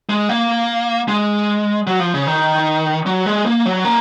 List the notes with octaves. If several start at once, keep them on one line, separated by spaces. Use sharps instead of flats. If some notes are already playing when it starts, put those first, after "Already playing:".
G#3
A#3
G#3
F#3
F3
C#3
D#3
F#3
G#3
A#3
F#3
A#3